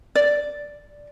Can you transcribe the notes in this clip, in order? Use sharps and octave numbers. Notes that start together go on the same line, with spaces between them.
D5